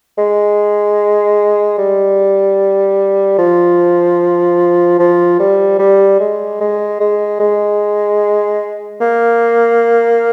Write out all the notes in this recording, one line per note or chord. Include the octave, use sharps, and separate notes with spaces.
G#3
G3
F3
F3
G3
G3
G#3
G#3
G#3
G#3
A#3